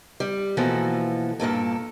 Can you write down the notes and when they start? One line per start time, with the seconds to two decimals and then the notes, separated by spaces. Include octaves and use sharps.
0.20 G3
0.57 B2 E3 F3 A#3 F#4 A4
1.40 G2 A#2 A#3 A4